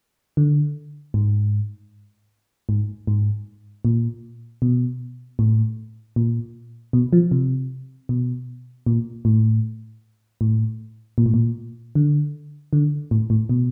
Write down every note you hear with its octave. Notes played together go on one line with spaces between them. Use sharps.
D3
G#2
G#2
G#2
A#2
B2
A2
A#2
B2
F3
C3
B2
A#2
A2
A2
A#2
A2
A#2
D3
D3
A2
A2
B2